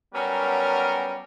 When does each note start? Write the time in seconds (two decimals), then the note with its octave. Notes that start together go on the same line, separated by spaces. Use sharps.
0.14 F#3 G3 B3 C#4 A#4